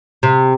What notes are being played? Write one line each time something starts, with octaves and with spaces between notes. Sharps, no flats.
C3